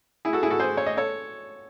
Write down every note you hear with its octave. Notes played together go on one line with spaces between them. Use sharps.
E4 G#4
F#4 A4
E4 G#4
F#4 A4
G#4 C5
C#5
D#5
A4 C#5